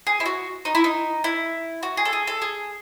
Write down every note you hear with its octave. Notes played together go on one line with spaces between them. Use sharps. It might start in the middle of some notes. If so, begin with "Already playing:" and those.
G#4
E4
F#4
D#4
E4
D#4
E4
F#4
G#4
A4
G#4
A4
G#4